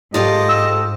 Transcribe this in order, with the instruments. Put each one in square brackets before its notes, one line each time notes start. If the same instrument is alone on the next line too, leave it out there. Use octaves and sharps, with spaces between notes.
[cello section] G#2 [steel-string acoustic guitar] F4 G4 A4 [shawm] D#5
[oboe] E6